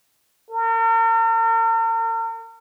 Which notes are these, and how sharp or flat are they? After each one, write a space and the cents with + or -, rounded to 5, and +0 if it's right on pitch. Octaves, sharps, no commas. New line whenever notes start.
A#4 -45